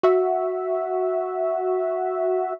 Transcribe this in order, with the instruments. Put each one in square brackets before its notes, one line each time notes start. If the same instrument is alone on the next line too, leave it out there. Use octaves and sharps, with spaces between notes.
[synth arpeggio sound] F#4 E5